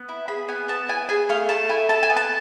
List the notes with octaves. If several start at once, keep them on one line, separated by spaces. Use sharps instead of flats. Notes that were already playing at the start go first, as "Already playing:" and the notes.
Already playing: B3
E4
G#4 B5
B3 G#5
B3 A5
E4 G#5
G#4 G#5
A3 F5
A3 A5
E4 G#5
A4 A5
G#5
B3
A5